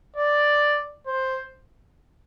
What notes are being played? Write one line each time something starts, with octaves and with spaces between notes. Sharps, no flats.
D5
C5